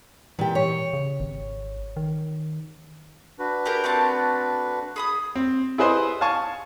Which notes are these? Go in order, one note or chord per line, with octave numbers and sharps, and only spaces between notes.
A#2 E3 G4
C#5
C#3
G#1
D#3
D4 F#4 B4
G4 G#4 A#4
A3 C4 A5
G#4 B5 D#6
C4
E4 G#4 B4 C5 D#5 C6
F5 G#5 A5 C#6